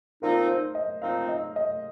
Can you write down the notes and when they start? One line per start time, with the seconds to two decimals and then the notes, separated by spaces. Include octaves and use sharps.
0.21 A#2 F3 C4 D#4 A#4
0.48 C5
0.75 D#5
1.02 A#2 F3 C4 D#4 F5
1.29 D#5
1.56 D#5